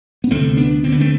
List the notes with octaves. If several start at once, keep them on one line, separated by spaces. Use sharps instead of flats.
B3
D2 C3 A3 C4
B3 D4
D2 D3 C4
B3
A3 C4